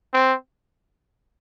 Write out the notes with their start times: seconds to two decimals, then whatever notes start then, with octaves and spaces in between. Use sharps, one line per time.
0.14 C4